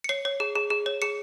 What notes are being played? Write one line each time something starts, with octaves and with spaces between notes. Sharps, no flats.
C#7
C#5 C7
C#5
G#4
G#4
G#4
C#5
G#4 C#7